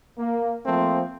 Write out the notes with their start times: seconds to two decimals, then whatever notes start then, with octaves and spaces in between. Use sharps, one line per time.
0.19 A#3
0.66 F3 A3 A#3 C4